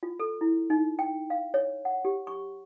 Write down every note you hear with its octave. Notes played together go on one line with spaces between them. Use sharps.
F4
A4
E4
D#4
G5
F5
C#5
F#5
G4
C#6